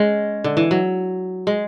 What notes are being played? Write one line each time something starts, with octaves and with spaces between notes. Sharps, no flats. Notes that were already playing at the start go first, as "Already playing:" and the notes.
Already playing: G#3 C#4
D3
E3
F#3
G#3